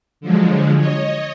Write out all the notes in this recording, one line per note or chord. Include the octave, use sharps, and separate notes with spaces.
D3 F3 F#3 G#3
C#5 D#5